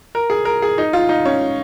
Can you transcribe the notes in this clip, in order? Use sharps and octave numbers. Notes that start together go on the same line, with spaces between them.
A#4
G#4
A#4
G#4
D#4
F4
D#4
C#4